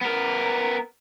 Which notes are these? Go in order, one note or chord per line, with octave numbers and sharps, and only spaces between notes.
B3 A#4